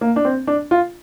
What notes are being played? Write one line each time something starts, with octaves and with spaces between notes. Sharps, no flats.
A#3
D4
C4
D4
F4